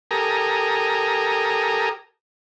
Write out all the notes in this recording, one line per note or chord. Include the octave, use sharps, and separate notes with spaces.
G4 A4 A#4 G#5 A#5 D#6